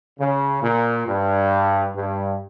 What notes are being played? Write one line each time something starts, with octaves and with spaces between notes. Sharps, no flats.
C#3
A#2
G2
G2